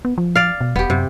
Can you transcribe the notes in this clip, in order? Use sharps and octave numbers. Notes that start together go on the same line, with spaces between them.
B3
F3
D5 F5
B2
E1 B3 G4
F#2 C3